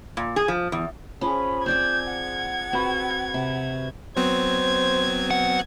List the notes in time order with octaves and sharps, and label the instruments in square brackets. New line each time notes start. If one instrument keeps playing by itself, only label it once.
[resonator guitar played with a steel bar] A#2
G#4
F3
E2
[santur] F3 G#4 [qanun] C#4 [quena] B5
[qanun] C4 D5 G5 [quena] G6 [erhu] G#6
[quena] F#5
[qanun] C4 [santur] F#4 B4 B5
[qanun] C3
[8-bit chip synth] F#3 B3 C4 [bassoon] C5 [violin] G#6
[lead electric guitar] F#5